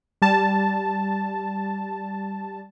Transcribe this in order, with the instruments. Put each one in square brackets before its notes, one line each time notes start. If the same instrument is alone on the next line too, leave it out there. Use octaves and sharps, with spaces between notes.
[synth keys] G3 A5